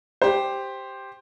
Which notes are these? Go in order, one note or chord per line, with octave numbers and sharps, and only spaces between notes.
G4 C5